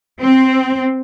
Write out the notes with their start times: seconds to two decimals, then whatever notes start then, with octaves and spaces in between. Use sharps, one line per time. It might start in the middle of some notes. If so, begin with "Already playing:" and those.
0.19 C4